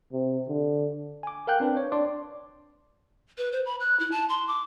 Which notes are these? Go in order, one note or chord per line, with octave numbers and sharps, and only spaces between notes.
C3
D3
G#5 D6
A#4 F5 G5 F#6 G6
C4 D4 B4
C#5
D4 D5 C6 D6
B4
C5
B5
F#6
E4
A5
C6
D6